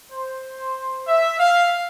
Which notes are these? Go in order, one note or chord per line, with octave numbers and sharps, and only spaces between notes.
C5
E5
F5